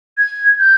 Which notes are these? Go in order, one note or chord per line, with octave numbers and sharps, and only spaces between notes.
G#6
G6